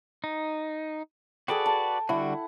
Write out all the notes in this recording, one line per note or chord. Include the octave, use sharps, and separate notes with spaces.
D#4
F#4 G#4 A4 B4 D5 G5
A5
D3 G3 E4 F#4 F#5